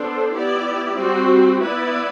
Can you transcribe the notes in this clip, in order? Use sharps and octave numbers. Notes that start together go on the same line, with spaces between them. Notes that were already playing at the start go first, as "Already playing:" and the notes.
Already playing: B3 D4 A4 C5
B3 E4 G4 D5
G3 C4 F#4
B3 E4 B4 D5